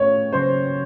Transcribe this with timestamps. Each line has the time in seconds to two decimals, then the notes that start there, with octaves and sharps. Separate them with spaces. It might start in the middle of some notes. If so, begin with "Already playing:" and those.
Already playing: A2 A3 C#4 F4 C#5
0.32 C#3 F#3 A#3 C5